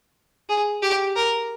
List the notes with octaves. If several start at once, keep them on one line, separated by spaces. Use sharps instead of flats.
G#4
G4
A#4